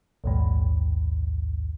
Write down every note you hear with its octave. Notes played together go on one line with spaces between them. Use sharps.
A#1 D#2 G#2